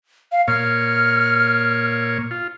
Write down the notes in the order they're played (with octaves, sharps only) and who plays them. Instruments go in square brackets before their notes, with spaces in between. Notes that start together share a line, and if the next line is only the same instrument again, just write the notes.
[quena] F5
[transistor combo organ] A#2 C#5 [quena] F6
[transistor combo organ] F4